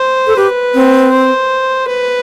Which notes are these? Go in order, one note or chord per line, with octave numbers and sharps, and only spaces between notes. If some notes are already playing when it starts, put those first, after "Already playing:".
Already playing: C5
A4
G4 B4
C4
C5
B4